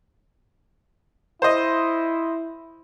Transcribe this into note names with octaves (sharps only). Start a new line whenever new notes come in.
E4 C5 D#5